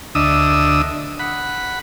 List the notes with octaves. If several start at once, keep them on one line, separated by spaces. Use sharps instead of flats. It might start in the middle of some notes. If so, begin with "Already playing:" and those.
D2 D4 D#5 E5 D#6 E6
F#5 B5